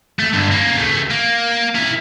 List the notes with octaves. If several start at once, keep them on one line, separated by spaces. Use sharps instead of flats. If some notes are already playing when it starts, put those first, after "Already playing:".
A3
G2 D3
A#3 C#4
C#2 A3
A#3
E4 A#4